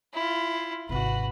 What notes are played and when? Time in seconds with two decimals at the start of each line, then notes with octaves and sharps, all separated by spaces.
0.13 E4 F4
0.89 G#1 C3 F#4 B4